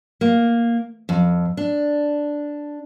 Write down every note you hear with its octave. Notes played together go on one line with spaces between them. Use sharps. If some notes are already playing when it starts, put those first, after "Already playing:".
A#3
F2
D4